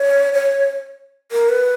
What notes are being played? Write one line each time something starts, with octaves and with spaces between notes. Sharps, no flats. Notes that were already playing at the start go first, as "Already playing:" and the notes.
Already playing: C#5
C#5
A#4
B4